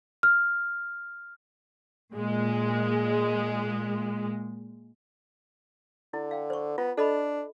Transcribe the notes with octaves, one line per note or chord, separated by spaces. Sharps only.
F6
A#2 G#3
D3 E4
F5 G5
C5 C#6
B3 F4
D4 A4 D#5 B5